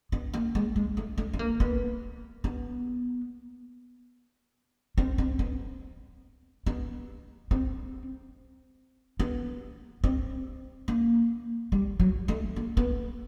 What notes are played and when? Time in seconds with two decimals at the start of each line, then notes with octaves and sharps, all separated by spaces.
0.12 B3
0.34 A#3
0.55 G#3
0.76 G#3
0.97 A3
1.18 A3
1.33 B3
1.39 A#3
1.60 B3
2.44 B3
4.98 C4
5.18 C4
5.39 B3
6.66 B3
7.51 C4
9.19 B3
10.04 C4
10.88 A#3
11.72 G3
12.00 F#3
12.28 A3
12.56 A#3
12.77 B3